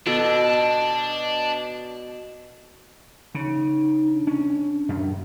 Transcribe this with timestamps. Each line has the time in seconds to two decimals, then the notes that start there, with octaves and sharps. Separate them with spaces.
0.06 B2 D4 A4
3.35 C#3 D#4
4.12 D4
4.27 C#4
4.89 F#2